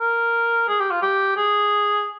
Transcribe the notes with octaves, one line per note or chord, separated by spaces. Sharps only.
A#4
G#4
G4
F4
G4
G#4